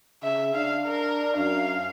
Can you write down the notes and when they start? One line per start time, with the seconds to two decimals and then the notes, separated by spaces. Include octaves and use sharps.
0.23 C#3 E5
0.55 D4 F5
0.86 A#4
1.37 F#2 F5